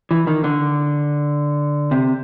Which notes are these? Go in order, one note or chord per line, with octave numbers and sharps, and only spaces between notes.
E3
D#3
D3
C3